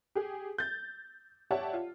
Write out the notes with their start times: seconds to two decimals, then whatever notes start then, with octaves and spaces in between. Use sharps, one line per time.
0.15 G4 G#4
0.58 G6 A6
1.51 G4 C#5 D5 E5 F#5 A5
1.73 F4